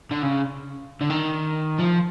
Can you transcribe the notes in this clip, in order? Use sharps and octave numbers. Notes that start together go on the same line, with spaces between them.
D3
C#3
D3
D#3
F3